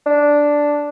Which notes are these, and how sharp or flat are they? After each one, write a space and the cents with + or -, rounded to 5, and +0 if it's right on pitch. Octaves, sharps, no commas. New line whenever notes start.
D4 -5